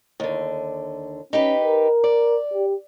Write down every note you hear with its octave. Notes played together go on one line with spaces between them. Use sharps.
D#2 D3
C#4 D#4 G4 B4
A#4
D5
G4